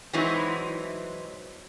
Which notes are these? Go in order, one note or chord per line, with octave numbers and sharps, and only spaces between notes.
E3 F#3 G#3 C4 D#4 E4